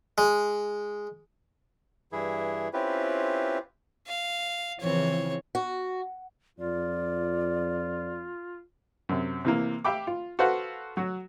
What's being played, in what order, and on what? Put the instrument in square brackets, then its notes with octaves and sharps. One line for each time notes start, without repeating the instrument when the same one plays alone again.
[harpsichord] G#3
[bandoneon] G2 E3 E4 G#4
C4 C#4 E4 F4 G4 B4
[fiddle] F5
[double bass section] C#3 E3 F3 [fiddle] C4 C#5
[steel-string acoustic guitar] F#4
[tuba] F2 [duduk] F4 [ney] D5
[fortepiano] F#2 C3
C3 E3 A#3
G4 E5 F5 G5 B5 D6
F4
F#4 A4 B4 C5 F5 F#5
F#3 F#4